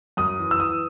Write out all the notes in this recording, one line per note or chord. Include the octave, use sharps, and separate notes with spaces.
F#2 D#6
E3
E6
E3 D#6